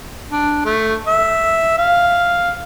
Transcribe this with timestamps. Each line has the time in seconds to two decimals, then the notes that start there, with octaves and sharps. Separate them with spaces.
0.31 D4
0.65 A3
1.07 E5
1.78 F5